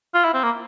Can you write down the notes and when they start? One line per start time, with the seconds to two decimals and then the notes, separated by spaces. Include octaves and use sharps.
0.14 F4
0.24 E4
0.34 C4
0.43 A#3